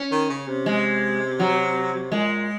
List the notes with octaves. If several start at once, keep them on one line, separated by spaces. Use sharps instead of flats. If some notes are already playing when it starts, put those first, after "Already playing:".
Already playing: C#4
D#3
C#3
C3
G#3
F#3
A#2 G#3